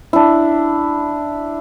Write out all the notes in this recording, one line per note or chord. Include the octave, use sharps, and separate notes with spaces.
D4 E4